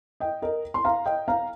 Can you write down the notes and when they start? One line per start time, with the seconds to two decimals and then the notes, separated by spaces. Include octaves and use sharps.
0.20 D#5 G5
0.42 A#4 D#5
0.74 C6
0.84 F5 A#5
1.06 D#5 G5
1.28 F5 A#5